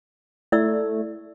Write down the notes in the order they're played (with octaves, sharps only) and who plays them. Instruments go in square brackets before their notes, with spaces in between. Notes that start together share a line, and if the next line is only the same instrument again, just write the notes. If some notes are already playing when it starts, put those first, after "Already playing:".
[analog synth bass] A3 [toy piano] E4 D5 E6